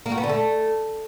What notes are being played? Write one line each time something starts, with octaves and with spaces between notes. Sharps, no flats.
A#3
F#4
B3
D3
A3